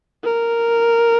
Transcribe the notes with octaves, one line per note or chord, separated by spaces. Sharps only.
A#4